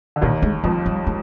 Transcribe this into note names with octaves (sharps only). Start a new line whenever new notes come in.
D3
D#2 A#2 D#3
G#3
F2 F3 G#3
G3
G#3